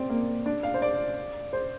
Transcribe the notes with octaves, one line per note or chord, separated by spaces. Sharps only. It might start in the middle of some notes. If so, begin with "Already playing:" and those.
Already playing: C4 D5
A#3
D4
F5
C5
D5
C5